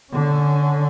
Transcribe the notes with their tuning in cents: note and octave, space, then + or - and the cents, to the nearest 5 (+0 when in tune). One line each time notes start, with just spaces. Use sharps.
D3 +0 C#4 +20